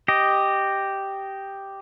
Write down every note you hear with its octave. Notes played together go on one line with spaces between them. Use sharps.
G4 D#5